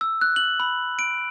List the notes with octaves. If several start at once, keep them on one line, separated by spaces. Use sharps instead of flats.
E6
F#6
F#7
B5
D7